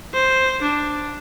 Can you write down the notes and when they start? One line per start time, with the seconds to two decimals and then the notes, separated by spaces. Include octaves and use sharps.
0.14 C5
0.62 D4